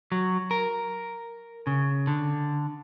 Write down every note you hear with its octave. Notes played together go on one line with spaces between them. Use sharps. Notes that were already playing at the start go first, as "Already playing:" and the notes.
F#3
A#4
C#3
D3